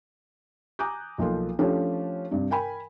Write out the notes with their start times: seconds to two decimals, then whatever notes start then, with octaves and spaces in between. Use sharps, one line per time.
0.79 G#5 A#5 D6 D#6 F#6 G6
1.18 B1 F3 A#3 F4 A4
1.59 F3 A3 C#4 D4 G4 A4
2.31 G2 C3
2.51 A#4 G5 G#5 B5